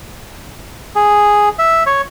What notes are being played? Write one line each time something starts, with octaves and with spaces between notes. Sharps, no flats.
G#4
E5
C#5